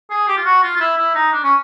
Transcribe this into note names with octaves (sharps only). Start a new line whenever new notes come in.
G#4
G4
F4
F#4
F4
F4
E4
E4
D#4
D4
C#4